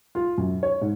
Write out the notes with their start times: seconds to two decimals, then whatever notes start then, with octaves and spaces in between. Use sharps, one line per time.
0.15 F4
0.38 F#2
0.63 C#5
0.81 G#2